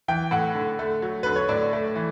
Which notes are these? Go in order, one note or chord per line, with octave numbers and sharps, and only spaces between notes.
E3 G5
A2 F#5
D3
A3
F#3
D3 B4
C#5
A2 D5
A3
E3